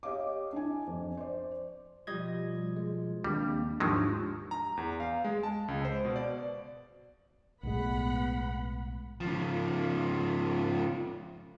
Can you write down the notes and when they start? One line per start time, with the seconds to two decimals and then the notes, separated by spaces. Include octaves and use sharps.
0.03 G4 C#5 D#5 F5 D6
0.53 D4 E4 G#5
0.87 F2
1.17 C5 D5
2.07 B2 F3 G3 F4 D#5 G#6
2.76 G#3
3.24 D#2 G3 A#3 C4 D4
3.80 G#2 D#3 F3 F#3 D4 F4 G4
4.51 A#5
4.77 E2
5.00 F5
5.24 G#3
5.43 A5
5.68 C#2
5.85 C5
6.05 B2
6.16 D5
7.63 B1 A2 G#3 B3 F#5 B5
9.21 C#3 F3